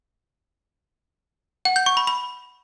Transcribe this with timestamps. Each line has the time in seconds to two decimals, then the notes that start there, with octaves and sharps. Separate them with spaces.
1.65 F#5
1.76 G6
1.86 C#6
1.97 B5
2.07 B5